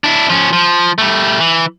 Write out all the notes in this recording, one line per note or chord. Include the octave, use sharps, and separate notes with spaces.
D4 E4
F3 C#4
F3
G3 A3
E3